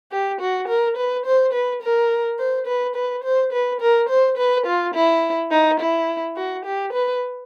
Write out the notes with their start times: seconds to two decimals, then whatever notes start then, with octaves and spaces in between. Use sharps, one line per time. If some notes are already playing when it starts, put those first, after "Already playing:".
0.12 G4
0.41 F#4
0.68 A#4
0.97 B4
1.26 C5
1.53 B4
1.82 A#4
2.39 C5
2.66 B4
2.95 B4
3.24 C5
3.53 B4
3.81 A#4
4.09 C5
4.37 B4
4.66 F4
4.94 E4
5.51 D#4
5.80 E4
6.36 F#4
6.65 G4
6.93 B4